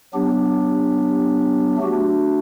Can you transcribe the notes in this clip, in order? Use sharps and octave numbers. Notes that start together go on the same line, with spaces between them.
F#3 B3 D4 G4
A3 D4 F#4